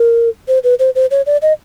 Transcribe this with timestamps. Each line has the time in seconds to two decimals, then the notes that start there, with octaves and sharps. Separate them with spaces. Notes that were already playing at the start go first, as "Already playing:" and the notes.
Already playing: A#4
0.48 C5
0.64 B4
0.79 C5
0.95 C5
1.11 C#5
1.26 D5
1.42 D#5